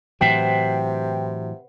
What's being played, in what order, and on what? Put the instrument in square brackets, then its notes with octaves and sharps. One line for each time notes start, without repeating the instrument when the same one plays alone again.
[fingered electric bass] A2 E3 F#3 [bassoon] C3 [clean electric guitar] B4 C5 F#5 [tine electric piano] G5